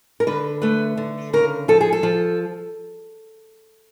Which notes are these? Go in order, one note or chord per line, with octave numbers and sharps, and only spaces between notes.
A#4
D3 B4
A3 B4
D3
C#3 A#4
F3 A4
G#4
A4
F3